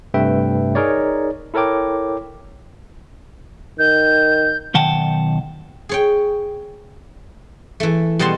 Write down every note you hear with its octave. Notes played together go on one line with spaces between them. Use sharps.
G2 C3 A3 B4 E5 G5
D#4 G#4 A#4 C#5 D5
E4 A4 A#4 C#5 G5 D6
D#3 G6
B1 D#3 F#5 G5 A5
G#4 C#5 G5
E3 A3
B2 G3 D#5 F#5 A5 C6